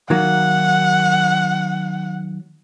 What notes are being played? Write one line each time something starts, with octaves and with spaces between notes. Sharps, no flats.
D#3 F#3 A#3 F#5